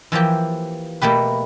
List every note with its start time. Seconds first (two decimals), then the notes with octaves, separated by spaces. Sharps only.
0.12 E3 F3 A#3 G4
1.02 B2 A3 A#3 G4 B4